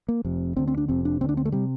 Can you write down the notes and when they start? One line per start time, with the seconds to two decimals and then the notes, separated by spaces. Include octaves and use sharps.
0.08 A#3
0.25 F1 F2 C3
0.57 D2 D3 C4
0.68 C4
0.78 D4
0.88 F1 F2 C3 C4
1.05 D4
1.21 D2 C4
1.24 D3 D4
1.37 C4
1.45 A3
1.52 C3 G3